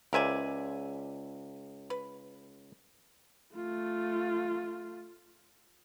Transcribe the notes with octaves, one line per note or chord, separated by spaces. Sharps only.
C#2 A#4 C5 D5 E5 G#5
B4
A3 F4